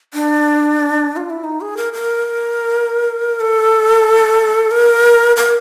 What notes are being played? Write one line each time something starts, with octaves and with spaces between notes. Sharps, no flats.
D4
F4
E4
D#4
G#4
A#4
A#4
A4
A#4
A#4